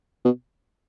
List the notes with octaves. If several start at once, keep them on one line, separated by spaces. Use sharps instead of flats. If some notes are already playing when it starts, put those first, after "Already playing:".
B2